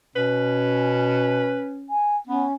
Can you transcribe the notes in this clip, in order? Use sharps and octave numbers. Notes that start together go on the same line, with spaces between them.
B2 C#4 B4
G#5
B3 C#4